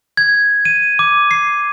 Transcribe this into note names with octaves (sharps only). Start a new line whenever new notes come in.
G#6
D#7
D6
C7